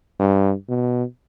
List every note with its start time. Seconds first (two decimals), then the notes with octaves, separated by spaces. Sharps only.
0.20 G2
0.69 B2